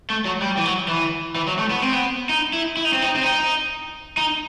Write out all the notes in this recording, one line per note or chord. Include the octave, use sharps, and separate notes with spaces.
A3
F#3
G3
E3
F#3
E3
E3
F#3
A3
B3
C4
B3
D#4
E4
E4
D#4
C4
D#4
C4
D#4
D#4